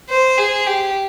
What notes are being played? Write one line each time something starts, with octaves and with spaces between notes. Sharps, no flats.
C5
G#4
G4